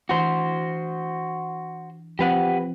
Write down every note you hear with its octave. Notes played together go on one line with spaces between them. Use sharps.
E3 D4 F#4 C5
F3 C4 G4 B4 F#5